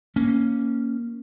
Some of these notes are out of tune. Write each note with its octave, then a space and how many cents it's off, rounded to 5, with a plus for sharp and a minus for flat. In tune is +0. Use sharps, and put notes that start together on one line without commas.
A#3 +0 C#4 +0